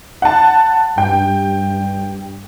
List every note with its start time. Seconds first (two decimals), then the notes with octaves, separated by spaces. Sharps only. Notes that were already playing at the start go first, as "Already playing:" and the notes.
0.22 F#5 A5
0.98 G2 G5